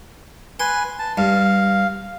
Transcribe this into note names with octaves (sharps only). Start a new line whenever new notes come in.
B4 G#5 C6
A5
G2 F5